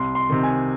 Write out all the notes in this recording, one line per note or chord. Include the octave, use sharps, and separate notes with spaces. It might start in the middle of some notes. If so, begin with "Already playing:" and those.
Already playing: C2 C6
C6
C3 D#3
G#5